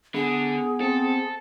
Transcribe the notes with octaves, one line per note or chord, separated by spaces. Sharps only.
D3 B3 G#4 F#5
C4 A4